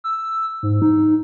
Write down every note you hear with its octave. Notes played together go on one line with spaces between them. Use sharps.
E6
G#2
D#4